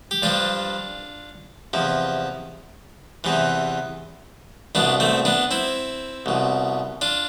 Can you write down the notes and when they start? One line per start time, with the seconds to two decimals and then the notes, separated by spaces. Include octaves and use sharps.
0.11 G4
0.22 G2 F3 D4 F4
1.73 E2 C3 F3
3.24 E2 C3 E3
4.75 C2 B2 B3 D4
5.00 A3 C4
5.25 B3 D4
5.51 C4 E4
6.26 C2 B2
7.01 D4 F4